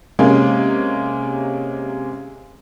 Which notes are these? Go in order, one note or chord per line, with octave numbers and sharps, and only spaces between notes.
C3 G#3 A#3 C#4